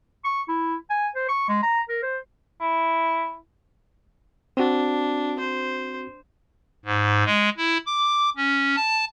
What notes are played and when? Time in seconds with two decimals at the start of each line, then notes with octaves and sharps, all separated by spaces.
0.24 C#6
0.48 E4
0.90 G#5
1.15 C5
1.29 C#6
1.48 G#3
1.63 A#5
1.89 A#4
2.02 C5
2.61 E4
4.57 C4 D4 F#4
5.39 C5
6.85 G#2
7.26 G#3
7.57 E4
7.86 D6
8.37 C#4
8.76 A5